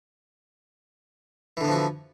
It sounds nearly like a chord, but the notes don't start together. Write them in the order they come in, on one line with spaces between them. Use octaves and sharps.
E3 D3 B3 F3 F#4